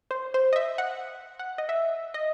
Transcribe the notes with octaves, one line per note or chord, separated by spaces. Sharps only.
C5
C5
D#5
E5
F#5
F#5
D#5
E5
D#5